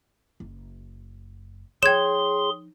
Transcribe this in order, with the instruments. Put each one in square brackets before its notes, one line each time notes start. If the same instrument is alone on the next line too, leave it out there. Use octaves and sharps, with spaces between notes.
[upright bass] F#1
[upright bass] F3 D#4 [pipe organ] G#4 C6 [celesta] C#5 G5 [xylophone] G#6 E7